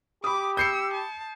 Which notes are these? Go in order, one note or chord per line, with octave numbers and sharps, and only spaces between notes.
G4 B5 D6 D#6
E6 G6 C7 C#7
A5